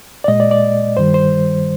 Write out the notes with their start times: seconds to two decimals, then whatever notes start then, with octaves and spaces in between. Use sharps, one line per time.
0.24 D5
0.28 A#2 G#3 D#5
0.40 D5
0.51 D5
0.97 G2 D#3 G3 C5
1.14 C5